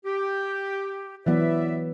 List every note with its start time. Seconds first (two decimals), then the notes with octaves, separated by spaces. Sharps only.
0.05 G4
1.26 E3 F#3 B3 B4 D5 E5